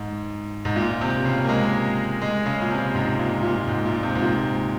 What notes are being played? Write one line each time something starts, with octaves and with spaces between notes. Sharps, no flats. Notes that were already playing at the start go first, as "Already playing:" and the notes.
Already playing: G#2
G#2
A#2
C3
C#3
A#3
G#3
G#3
C#3
A#2
C3
G#2
A#2
A#2
G#2
A#2
C3
G#2
A#2